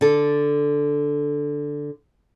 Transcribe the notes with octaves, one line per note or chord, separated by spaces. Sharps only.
D3 A4